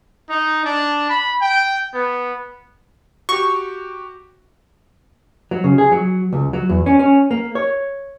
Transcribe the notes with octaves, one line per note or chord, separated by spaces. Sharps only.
D#4
D4
B5
G5
B3
F#4 G4 C#6
F#3
C#3
G#4
F#3
C#2
F#3
E2
C#4
C#4
A#3
C#5